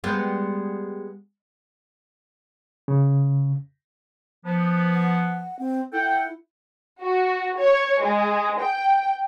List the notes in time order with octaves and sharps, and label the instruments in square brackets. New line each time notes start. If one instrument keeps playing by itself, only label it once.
[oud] G3 G#3 B3
[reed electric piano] C#3
[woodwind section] F3 B3
[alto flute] F#5
C4
[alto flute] E4 [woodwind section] A4 F#5 G5
[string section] F#4
C#5
G#3
G5